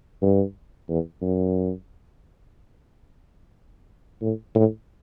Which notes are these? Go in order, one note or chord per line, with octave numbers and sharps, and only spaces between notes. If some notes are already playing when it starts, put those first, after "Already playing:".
G2
E2
F#2
A2
A2